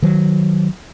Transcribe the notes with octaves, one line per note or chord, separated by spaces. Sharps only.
D#3 F#3